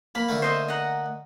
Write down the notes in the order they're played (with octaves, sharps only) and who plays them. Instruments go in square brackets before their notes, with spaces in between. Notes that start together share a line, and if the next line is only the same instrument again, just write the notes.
[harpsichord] A#3 [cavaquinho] B5
[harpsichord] D3 A3 A#3
[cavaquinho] C5 D#5 E5
D#5 F#5 A#5